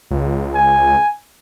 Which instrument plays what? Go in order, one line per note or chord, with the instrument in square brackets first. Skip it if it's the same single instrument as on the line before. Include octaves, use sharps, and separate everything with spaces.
[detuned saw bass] C#2
[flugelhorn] G#5